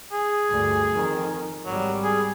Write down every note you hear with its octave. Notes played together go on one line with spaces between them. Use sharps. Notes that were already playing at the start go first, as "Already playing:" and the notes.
G#4
D2 G2
F2 D#3
G#1 F#3 G3
G#4